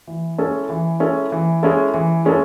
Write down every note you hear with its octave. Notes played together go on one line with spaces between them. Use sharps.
E3
G#3 C#4 E4 A4
E3
G#3 C#4 E4 A4
E3
G#3 C#4 E4 A4
E3
G#3 C#4 E4 A4